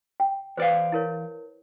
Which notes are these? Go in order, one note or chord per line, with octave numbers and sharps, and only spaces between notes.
G5
E2 B4 C5 D5 F5
E4 A#4 C#5